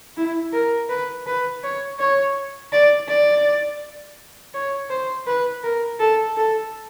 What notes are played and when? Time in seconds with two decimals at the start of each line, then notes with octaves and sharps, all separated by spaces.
0.17 E4
0.53 A#4
0.89 B4
1.27 B4
1.63 C#5
1.99 C#5
2.73 D5
3.09 D5
4.54 C#5
4.90 C5
5.27 B4
5.63 A#4
6.00 A4
6.37 A4